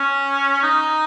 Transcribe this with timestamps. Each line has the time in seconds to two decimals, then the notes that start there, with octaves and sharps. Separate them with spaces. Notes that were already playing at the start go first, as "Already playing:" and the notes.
Already playing: C#4
0.63 D#4